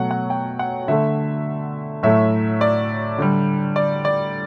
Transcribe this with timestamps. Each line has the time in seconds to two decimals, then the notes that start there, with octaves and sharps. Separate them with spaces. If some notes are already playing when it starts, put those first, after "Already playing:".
Already playing: B2 F#3 A3 F#5
0.11 F#5
0.30 G5
0.59 F#5
0.88 D3 A3 E5
2.03 A2 F#3 A3 E5
2.61 D5
3.18 D3 G3
3.76 D5
4.05 D5